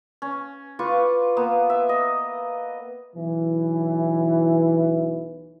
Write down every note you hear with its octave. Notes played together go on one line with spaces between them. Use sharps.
C#4
F4 B4 C#6 D6
A#3 B3
E5
D#5
B1 E3